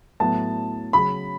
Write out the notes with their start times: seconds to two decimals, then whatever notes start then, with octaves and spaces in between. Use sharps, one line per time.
0.20 A2 F#3 B3 A5
0.93 C#3 F#3 C#4 G#4 B5